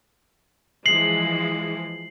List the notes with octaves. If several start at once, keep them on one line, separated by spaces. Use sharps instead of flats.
E3 F3 G#3 C7 F#7